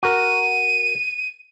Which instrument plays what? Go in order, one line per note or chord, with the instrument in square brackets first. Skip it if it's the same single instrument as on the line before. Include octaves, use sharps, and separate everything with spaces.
[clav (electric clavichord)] F#4 A#4 [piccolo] D#7